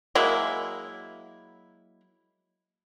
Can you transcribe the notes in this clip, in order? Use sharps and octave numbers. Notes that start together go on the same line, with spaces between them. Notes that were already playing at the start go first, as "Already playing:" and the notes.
F#3 G#3 A#3 E4